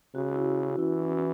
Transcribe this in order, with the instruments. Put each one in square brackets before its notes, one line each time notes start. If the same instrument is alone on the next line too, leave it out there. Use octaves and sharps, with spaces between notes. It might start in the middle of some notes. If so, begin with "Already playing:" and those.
[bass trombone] C#3 [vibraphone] F#4
[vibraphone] F#4
E4
C#4
[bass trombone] E3 [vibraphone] E4
[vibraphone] C#4